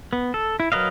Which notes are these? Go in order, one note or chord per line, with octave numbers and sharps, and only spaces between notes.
B3
A4
E4
F#3 A#4 B4 D#5 F5